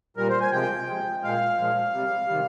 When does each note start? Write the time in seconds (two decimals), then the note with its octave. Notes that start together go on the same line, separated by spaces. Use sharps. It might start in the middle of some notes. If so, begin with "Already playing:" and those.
0.17 A#2 G3 A#4
0.29 C5
0.40 G#5
0.52 C3 F3 G#3 G5
0.87 C3 F3 G#3
1.22 A#2 G#3 F5
1.58 A#2 F3 G#3
1.92 C3 G3
2.28 C3 D#3 G3